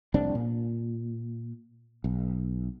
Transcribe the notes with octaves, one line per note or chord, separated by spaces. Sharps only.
F1 C2 C4 D4
A#2
B1